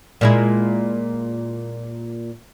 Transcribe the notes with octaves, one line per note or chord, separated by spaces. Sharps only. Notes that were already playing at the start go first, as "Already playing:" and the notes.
A#2 G#3 E4